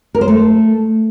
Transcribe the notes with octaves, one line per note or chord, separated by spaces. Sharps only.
A#4
C5
A3